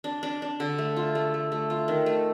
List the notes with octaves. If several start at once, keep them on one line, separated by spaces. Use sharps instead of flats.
D4
D4
D4
D3
A3
F4
A3
A3
A3
F4
D#3
A3